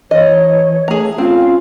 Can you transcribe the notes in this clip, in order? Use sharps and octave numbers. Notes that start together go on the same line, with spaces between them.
E3 C#5 D#5
A3 G#4 A#5
C4 C#4 F4 F5